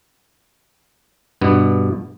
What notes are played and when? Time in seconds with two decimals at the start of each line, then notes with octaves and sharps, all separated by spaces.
1.41 G2 B2 B3